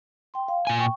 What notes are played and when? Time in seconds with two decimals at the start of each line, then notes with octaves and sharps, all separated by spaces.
0.34 G5 C6
0.48 F5
0.67 A#2 G#5
0.79 G5 C#6